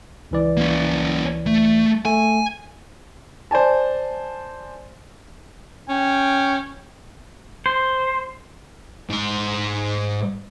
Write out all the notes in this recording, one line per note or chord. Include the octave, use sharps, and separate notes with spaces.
C#2 E3 D5
A#3 C#4
A3
A3 G#5
C5 D5 G#5 A5
C#4 G5
C5
G#2 C6